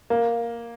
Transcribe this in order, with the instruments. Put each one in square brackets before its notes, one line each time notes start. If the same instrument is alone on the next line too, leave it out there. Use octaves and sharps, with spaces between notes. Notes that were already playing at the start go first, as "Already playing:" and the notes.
[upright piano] A#3